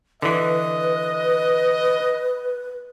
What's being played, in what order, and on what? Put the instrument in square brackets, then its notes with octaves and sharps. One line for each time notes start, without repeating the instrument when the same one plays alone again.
[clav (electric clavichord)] D3 E3 [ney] B4 [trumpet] D#5